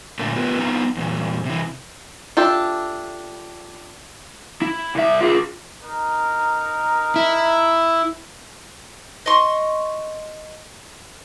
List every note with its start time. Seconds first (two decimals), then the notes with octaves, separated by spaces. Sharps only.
0.19 A#2 D3 A3 A#3 A4
0.36 B3 F4 G4 A#4 B4
0.59 B3 C4 D#4 F4 A#5
0.97 E2 A#2
1.45 C3 E3
2.37 D4 F4 G4 A4 E5
4.62 E4
4.95 C2 E5
5.21 F4 G#4
5.83 D#4 A#4
7.16 E4
9.26 D#5 C6 C#6